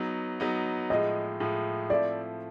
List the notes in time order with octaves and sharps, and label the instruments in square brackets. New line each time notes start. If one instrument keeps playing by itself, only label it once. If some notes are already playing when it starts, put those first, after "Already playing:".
Already playing: [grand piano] F#3 B3 D#4
F#3 B3 D#4
[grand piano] A2 F3 G#3 [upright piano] D#5
[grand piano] A2 F3 G#3
[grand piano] F3 A3 C4 E4 [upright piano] D5